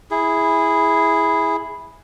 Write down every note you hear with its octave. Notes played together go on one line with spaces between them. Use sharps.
E4 G#4